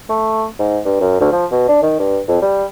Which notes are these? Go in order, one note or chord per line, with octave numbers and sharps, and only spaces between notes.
A3
G#2
G2
F#2
D2
F3
B2
D4
D#3
G2
F2
G3